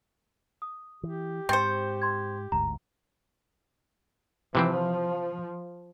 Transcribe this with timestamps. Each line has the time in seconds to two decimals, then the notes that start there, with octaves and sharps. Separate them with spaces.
0.62 D#6
1.03 E3 G4
1.49 G#2 C4 C5 C#6 A6 C#7
2.02 C6 G#6
2.52 G1 D2 G#2 A#5
4.55 C3 E3 F3 C4